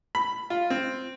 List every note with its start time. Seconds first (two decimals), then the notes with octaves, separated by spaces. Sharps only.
0.15 B5
0.50 F4
0.70 C4